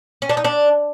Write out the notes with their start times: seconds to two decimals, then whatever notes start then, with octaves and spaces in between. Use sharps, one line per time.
0.22 C#4
0.29 D4
0.37 D#4
0.45 D4